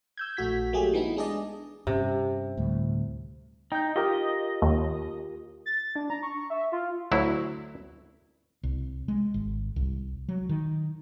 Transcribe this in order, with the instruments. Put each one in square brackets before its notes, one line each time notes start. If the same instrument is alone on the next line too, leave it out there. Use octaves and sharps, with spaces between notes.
[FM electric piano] E6 G6 G#6
A#1 A3 F#4 B6
F#3 A3 A#3 G4 G#4
E3 B3 D#4 E4
G#3 D4 G#4 D5 D#5
[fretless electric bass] G2 C#4 [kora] C3
[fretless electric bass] D2 A2 G3
[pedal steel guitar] D#4 [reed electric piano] G5 G6
[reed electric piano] F4 G4 A#4 [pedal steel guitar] D#5
[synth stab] D#2
[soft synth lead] A6
D4
A#5
C#6
E5
F4
[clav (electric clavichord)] D2 F#3 E4
[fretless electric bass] C2
G#3
G#1
C2
F#3
D#3